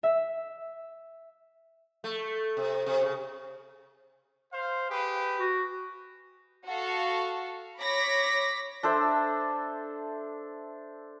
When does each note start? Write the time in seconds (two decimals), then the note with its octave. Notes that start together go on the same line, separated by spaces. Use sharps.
0.03 E5
2.04 A3
2.57 C3
2.86 C3
3.02 C#3
4.53 C5 F5
4.90 G4 G#4 B4
5.40 F#4
6.67 F#4 A4 F5
7.79 C#5 B5 D6 A#6 B6
8.83 D4 A4 C5 E5